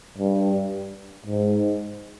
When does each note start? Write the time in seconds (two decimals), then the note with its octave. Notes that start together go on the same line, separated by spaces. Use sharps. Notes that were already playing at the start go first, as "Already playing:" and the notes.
0.18 G2
1.26 G#2